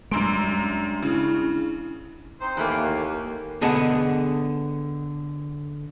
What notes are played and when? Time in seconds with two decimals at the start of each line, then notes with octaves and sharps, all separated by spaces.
0.11 F#2 G3 G#3 D4 C6 D7
1.03 C#3 E4
2.41 C4 D#4 C5
2.57 D#2 E3 A3 A#3
3.61 D3 B3 G#4 D#5 F#5 A5